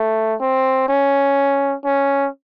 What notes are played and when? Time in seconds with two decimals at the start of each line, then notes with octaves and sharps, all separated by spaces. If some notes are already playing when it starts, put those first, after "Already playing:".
Already playing: A3
0.41 C4
0.89 C#4
1.85 C#4